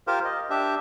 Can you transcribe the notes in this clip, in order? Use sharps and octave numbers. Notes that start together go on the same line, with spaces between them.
F4 G4 A#4 C5 F5
D#5
D4 G4 E5